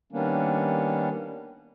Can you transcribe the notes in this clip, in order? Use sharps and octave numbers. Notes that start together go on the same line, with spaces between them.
D#3 G3 A#3 B3 C#4 D4